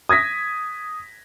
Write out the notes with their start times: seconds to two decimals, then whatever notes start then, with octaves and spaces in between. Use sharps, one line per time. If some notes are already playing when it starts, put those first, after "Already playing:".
0.09 D#6 G#6 A#6 B6